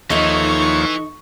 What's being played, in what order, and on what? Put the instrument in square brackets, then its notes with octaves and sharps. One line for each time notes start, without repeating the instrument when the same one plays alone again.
[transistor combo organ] D#2 F3 C#5 [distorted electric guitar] E3 [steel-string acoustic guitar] D#4 A4 D#5 [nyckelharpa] C#6